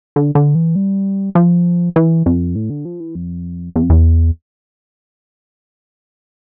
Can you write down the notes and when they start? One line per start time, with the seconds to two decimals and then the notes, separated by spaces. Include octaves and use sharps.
0.16 D3
0.35 D3
0.55 E3
0.76 G3
1.35 F3
1.96 E3
2.26 F2
2.56 A2
2.70 D3
2.85 F3
3.00 E3
3.15 F2
3.76 E2
3.82 F2
3.90 E2